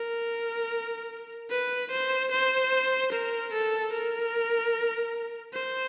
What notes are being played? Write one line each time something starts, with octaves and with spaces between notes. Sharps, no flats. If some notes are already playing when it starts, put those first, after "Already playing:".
Already playing: A#4
B4
C5
C5
A#4
A4
A#4
C5